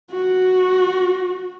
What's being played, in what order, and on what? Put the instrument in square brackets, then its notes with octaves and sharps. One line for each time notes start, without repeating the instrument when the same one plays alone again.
[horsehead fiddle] F#4